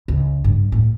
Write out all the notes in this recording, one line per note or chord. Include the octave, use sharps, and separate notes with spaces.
C#2
G2
A2